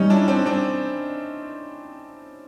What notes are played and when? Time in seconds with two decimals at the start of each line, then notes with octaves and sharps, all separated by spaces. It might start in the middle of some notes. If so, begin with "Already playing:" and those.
Already playing: G3 C#4 D#4
0.10 D4 E4
0.28 C4 D4
0.46 C4 D4